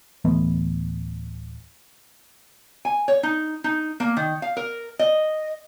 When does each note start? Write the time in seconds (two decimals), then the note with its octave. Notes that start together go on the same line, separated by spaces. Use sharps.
0.25 D1 E3 A3 B3
2.85 G#5
3.08 C#5
3.23 D#4
3.64 D#4
4.00 A#3
4.17 D#3
4.42 F5
4.57 A#4
4.99 D#5